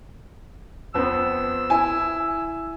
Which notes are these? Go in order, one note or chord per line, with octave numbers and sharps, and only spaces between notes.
F2 B3 C4 E6
E4 G#5